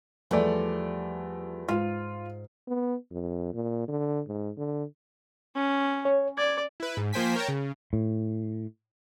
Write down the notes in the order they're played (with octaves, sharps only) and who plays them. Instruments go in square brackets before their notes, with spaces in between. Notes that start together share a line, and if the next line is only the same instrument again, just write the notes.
[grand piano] E2 A3 D5 [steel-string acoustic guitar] F3 G3 F4
[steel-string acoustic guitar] G#2 [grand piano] F4
[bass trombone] B3
F2
A#2
D3
G#2
D3
[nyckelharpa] C#4
[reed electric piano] C#5
[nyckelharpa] D5 [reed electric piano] G#6
[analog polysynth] E4 B4
G#2
F3 A#3 C5 G5 G#5 B6
A#4 C#5 G5 A5 A#5
C#3
[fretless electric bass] A2